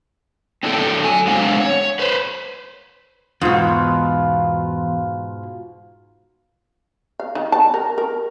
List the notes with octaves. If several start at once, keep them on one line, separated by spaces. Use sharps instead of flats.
C4 D4 E4 A4 G5
F#3 G#5
G#3 C4 D4 C5 F5 F#5
C#5
B4 C5
E2 G#2 B2 F4
F5
D#3
A5
A#4
A#4